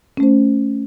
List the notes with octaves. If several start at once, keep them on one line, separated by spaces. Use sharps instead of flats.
A3 C#4 C5